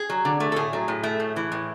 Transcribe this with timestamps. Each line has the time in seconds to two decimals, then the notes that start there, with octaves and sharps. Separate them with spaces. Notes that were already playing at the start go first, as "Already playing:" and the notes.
Already playing: G#4
0.10 F#3
0.25 D3
0.40 A3
0.52 A4
0.56 A2 G#4
0.73 F#3
0.88 A2
1.04 A3
1.20 A2
1.36 E3
1.52 A2